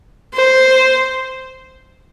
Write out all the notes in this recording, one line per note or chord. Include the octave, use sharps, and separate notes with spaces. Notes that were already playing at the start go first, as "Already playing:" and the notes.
C5